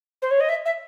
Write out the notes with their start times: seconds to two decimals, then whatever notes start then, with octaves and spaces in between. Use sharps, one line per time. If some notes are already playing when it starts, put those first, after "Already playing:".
0.22 C5
0.31 C#5
0.40 D#5
0.49 E5
0.66 E5